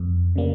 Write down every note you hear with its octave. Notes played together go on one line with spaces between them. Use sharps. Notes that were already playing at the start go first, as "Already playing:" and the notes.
Already playing: F2
C#3 G3 A#3